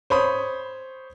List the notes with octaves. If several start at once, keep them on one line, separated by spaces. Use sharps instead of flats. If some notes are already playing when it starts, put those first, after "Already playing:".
C5 C#5 B5 D#6